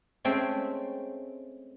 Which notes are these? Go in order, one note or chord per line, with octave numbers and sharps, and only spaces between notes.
G#3 A3 C4 C#4 G5